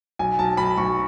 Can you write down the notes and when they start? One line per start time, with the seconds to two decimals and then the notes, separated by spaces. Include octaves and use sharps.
0.19 B1 G#5
0.39 B1 A5
0.57 B1 B5
0.78 B1 C#6